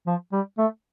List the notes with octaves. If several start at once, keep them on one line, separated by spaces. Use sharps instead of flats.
F3
G3
A3